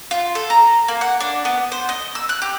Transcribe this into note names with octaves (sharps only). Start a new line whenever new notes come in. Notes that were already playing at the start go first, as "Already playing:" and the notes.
F4
A4
A#5
A#3
F#5
D4
B3
C5
D#5
E6
F#6
G4